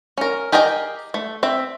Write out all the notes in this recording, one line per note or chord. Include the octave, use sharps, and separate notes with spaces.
C#4 A#4
G4 G#4 A#4 D#5 G5
A3
C4 E5